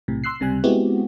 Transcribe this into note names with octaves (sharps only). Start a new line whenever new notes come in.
B1 A2 C3
C6 E6 F#6 C7
C#2 C3 G3 G#5 F#6
G#3 B3 C4 E4 F#4 G4